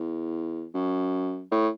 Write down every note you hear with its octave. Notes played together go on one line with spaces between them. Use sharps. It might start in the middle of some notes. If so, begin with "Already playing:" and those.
Already playing: E2
F#2
A2